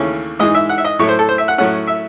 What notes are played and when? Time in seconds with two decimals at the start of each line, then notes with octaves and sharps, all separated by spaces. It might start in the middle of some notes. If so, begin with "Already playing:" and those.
Already playing: D#2 C#3 E3 A3 C#4
0.39 G#2 E3 G#3 D#5
0.54 E5
0.69 F#5
0.78 E5
0.84 D#5
0.99 A2 F#3 A3 C#5
1.08 C5
1.19 A4
1.29 C5
1.38 E5
1.48 F#5
1.58 A2 F#3 A3 C#4 F#5
1.87 E5